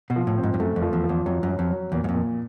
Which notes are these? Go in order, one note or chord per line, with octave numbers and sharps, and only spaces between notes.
B2
F3
A2
C4
G#2
G2
F#2 A3
F2
F3
E2
F3
E2
F2 F#3
F#2
F#3
F2
F#3
E2 A#2
F#2
F2
A#2